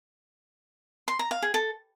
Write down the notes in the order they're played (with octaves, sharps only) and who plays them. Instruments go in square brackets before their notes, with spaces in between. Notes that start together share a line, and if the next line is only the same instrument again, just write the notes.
[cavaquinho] C6
A#5
F5
G#4
A4